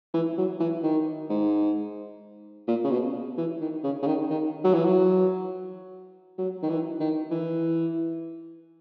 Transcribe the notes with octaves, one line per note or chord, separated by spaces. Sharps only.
E3
F#3
E3
D#3
G#2
A#2
C#3
B2
E3
D#3
C#3
C#3
D#3
D#3
F#3
E3
F#3
F#3
D#3
E3
D#3
E3